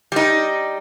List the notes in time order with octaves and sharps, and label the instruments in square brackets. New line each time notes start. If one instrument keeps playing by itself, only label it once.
[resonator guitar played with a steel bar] G3 D#4